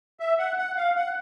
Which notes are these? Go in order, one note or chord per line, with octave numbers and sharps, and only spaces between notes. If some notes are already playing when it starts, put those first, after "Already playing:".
E5
F#5
F#5
F5
F#5